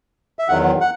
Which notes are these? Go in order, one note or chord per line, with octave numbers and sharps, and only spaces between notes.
E5
E2 D#3 F#3 F#5
F#5